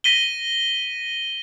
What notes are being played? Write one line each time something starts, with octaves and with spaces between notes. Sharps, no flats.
A#6 B6 D#7 G7